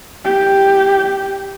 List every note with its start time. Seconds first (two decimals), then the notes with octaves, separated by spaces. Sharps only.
0.25 G4